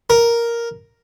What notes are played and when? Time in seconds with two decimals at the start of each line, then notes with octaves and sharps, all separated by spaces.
0.10 A#4